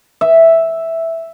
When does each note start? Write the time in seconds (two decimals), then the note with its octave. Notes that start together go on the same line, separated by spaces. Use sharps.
0.21 E5